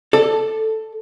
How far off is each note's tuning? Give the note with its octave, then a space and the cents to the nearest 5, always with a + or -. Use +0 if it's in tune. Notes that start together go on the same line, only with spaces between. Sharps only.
A4 +0 D5 +20